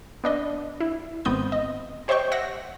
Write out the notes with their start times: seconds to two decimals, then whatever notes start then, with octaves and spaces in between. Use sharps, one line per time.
0.24 B3 D4 D#5
0.80 E4
1.25 G#1 B3 C4 D#6 G6
1.52 D#5
2.08 G4 C5 C#5 D#5 G5 C#6
2.32 E5 F#5 A#6